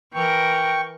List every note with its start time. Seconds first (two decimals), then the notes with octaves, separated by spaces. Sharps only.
0.13 E3 A#4 G5 C#6